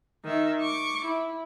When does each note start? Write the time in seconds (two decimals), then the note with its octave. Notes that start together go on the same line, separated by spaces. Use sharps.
0.25 D#3 E5
0.61 C#6 D6
1.05 E4